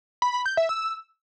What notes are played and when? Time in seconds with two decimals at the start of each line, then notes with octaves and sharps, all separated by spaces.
0.22 B5
0.34 B5
0.46 G6
0.57 E5
0.69 E6